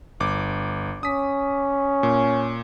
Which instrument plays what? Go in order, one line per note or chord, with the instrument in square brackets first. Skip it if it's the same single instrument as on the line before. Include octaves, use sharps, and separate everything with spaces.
[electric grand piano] G1 D6
[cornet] C#4 [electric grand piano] D#6 B6
[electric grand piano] A#2